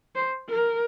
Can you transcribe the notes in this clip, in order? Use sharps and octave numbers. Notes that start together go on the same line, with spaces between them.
C5
A#4